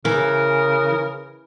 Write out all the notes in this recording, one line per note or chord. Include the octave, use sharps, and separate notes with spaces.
C#3 E3 A#4